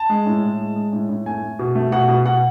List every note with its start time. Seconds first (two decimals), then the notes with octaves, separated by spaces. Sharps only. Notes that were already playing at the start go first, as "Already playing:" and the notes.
Already playing: A5
0.09 G#3
0.26 A2
0.43 A2
0.60 G#3
0.76 G#3
0.92 A2
1.09 A2
1.26 A3 G#5
1.43 A3
1.59 B2
1.75 A3
1.92 B2 F#5
2.09 B2
2.26 B2 F#5